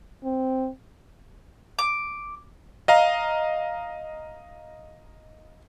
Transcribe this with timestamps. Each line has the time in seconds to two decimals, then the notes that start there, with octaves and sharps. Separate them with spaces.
0.24 C4
1.79 D6
2.88 D#5 F5 A#5